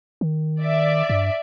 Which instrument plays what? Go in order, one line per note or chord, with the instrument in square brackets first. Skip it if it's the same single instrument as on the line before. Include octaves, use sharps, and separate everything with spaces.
[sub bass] D#3
[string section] D5 E5
[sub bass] G2